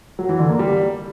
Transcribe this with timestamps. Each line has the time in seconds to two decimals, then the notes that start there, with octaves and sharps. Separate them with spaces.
0.19 F#3
0.29 E3
0.39 D3
0.49 A#3
0.59 G3